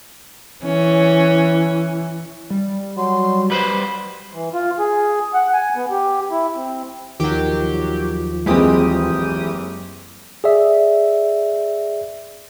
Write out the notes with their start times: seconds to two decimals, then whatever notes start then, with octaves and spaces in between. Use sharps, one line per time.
0.65 E3 C#4
2.50 G3
2.98 F#3 C6
3.50 G3 B4 C5 B5
4.33 E3
4.54 F4
4.79 G#4
5.34 F#5
5.53 G#5
5.76 B3
5.91 G4
6.31 E4
6.56 C4
7.20 D#2 D#3 F3 F#3 G4
8.46 F#1 E3 G#3 C4 G4 G#4 D#6
10.44 G#4 D5 E5